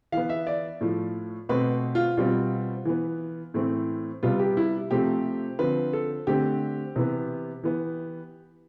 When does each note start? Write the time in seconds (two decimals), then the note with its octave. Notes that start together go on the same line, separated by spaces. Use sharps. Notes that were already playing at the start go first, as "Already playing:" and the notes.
0.12 E3 B3 F5
0.29 E5
0.47 D5
0.81 A2 F3 A3
1.49 B2 A3 C4 B4
1.95 F4
2.17 B2 G3 C4 F4
2.85 E3 B3
3.54 A2 E3 A3 C4
4.23 C3 G3 B3 F4
4.39 G4
4.57 E4
4.91 C3 F3 A3 C4 G4
5.59 D3 F3 C4 B4
5.93 A4
6.27 D3 A3 C4 G4
6.96 C3 E3 B3
7.63 E3 B3